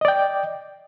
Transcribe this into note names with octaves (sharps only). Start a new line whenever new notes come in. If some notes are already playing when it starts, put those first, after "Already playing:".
D5 D#5 G5